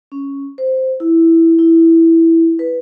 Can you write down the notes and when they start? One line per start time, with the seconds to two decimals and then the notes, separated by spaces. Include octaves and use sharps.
0.12 C#4
0.58 C5
1.00 E4
1.59 E4
2.59 B4